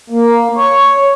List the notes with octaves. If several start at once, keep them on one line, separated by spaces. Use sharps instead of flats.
A#3
C#5